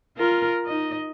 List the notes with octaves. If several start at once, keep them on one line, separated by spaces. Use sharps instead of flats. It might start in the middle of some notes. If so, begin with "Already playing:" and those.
F4 A#4
D#4 D#5